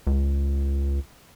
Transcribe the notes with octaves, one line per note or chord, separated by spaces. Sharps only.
C#2